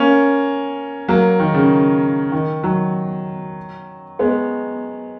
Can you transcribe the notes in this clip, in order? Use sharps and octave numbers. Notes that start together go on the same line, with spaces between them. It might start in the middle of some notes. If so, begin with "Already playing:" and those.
Already playing: A#3 C#4
F#3 A#3
D#3
C#3
D#3
D#3 F#3
G#3 B3